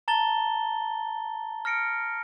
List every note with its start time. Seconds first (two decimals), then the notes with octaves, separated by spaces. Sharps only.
0.08 A5 A#5 A6 G7
1.65 F6 A#6 C#7 D7